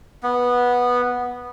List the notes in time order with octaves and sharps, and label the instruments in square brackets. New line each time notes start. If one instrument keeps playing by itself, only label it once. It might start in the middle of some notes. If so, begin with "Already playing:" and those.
[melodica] B3